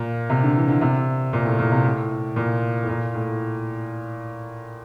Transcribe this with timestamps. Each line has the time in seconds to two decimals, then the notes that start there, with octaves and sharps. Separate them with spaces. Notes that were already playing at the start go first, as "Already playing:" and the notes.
Already playing: A#2
0.30 C3
0.43 D3
0.56 E3
0.68 D3
0.81 C3
1.33 A#2
1.45 A2
1.59 A#2
1.72 C3
1.84 A2
2.36 A#2
2.83 A2
2.88 A#2
3.14 A2